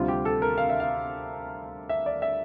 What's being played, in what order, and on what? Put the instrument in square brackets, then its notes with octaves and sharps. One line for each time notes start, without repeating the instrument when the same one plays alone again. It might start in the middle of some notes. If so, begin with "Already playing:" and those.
Already playing: [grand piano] D2 C3 G3 C4 F4
G4
A4
A#4
F5
E5
F5
E5
D5
E5